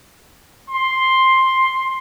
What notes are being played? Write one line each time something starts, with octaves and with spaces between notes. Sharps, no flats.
C6